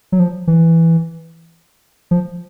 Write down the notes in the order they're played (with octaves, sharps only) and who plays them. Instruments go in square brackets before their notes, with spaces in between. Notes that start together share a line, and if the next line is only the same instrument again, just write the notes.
[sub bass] F#3
F3
E3
F3